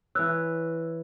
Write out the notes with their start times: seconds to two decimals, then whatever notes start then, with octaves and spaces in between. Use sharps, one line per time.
0.15 E3 B4 C#5 E6 F#6